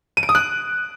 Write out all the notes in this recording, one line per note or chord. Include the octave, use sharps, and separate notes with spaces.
D#7
D7
D#6
F#6